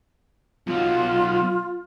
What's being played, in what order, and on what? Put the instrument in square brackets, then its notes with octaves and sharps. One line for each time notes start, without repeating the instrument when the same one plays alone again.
[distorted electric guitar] B1 F#3 [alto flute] F4